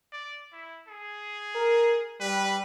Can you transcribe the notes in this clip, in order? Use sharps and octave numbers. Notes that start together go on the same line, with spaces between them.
D5
E4
G#4
A#4
G3 B4